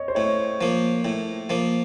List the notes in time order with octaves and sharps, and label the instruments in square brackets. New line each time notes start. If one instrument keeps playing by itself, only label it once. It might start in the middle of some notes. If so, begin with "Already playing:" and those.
Already playing: [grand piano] C#5 D#5
C5
[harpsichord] A2 [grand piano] C#5
[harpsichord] F3 A#3
A2
F3 A#3